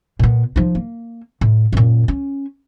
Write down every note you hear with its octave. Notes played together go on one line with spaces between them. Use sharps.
A#2 B3
F3 D#4
A#3
A2
F#2 A#2
C#4